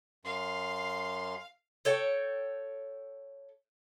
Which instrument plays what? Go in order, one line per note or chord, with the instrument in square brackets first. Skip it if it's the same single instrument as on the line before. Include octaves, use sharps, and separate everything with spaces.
[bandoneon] F#2 C6 [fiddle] F5
[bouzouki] A4 C#5 G5